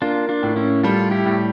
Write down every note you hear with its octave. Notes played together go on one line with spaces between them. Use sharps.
A#3 D4 F4
D4 F4
A2
C#4 E4
G3 F4 A4
E4 G4
A2